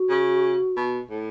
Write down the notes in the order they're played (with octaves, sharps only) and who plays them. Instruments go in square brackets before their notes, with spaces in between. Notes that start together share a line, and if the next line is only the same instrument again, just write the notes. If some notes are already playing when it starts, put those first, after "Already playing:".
Already playing: [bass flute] F#4
[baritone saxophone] C#3
B2
A2